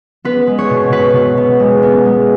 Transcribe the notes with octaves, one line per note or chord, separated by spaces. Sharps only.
B3 B4
G#3
C#5
B2
B2 B4
B2
B3
G#3
B3
G#3